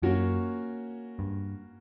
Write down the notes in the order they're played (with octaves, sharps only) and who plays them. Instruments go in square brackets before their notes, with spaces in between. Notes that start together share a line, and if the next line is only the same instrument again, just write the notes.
[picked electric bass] F#2 [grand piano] A#3 C#4 F#4 C#5
[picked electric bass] G2